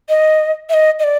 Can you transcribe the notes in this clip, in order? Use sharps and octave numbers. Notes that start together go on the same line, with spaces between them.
D#5
E5
D#5
D#5
D5